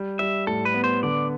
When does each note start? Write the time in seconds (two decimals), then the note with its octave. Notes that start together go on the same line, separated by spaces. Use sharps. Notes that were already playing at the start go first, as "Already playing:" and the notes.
Already playing: G3
0.19 G3 E5
0.47 A2 A4
0.65 B4
0.74 B3
0.84 C5
1.03 D3 D5